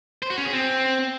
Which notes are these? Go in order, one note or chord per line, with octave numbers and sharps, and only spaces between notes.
C5
F#4
C#4
G#4
C4